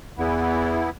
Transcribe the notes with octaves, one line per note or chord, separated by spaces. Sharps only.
E2 E3 B3 E4